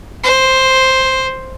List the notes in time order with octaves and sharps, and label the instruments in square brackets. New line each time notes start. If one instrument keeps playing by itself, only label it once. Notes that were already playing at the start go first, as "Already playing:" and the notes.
[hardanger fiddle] C5